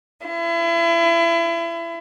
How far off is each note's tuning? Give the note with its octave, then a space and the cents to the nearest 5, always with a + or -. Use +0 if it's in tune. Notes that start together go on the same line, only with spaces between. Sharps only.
E4 +35